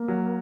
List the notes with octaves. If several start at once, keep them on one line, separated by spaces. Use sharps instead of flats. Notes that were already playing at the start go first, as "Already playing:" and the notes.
Already playing: A#3
F#3